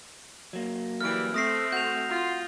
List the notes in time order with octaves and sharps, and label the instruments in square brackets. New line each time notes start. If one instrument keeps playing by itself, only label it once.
[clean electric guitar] F#3 A#3
[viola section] E3 G3 [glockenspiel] F6 D7
[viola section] A3 C4 [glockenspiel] D#6 A#6 C7
[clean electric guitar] F#4 [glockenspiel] G6 F7
[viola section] F4